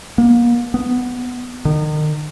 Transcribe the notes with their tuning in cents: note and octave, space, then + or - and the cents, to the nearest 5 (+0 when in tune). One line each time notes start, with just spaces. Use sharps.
A#3 +35
B3 +5
D#3 -35